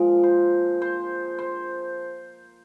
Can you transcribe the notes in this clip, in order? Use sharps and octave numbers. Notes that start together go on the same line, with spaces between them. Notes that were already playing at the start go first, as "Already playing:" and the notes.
Already playing: A#2 F3 G#3 A#4
C5
C5
C5